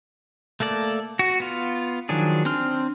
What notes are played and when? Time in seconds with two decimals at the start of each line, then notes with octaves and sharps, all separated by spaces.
0.60 A3 A#3 A4 D5
1.19 F#4
1.40 B3 F4
2.09 D#3 F3 F#3 D4 G#4
2.45 C4 D4 C6 F6